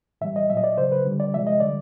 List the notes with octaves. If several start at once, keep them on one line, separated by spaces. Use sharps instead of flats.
A2 E3 G3 E5
D#5
A#2 F#3 E5
D#5
D5
C#3 F#3 C5
B4
D3 G3
D5
C3 F3 G#3 E5
D#5
D3 G3 D5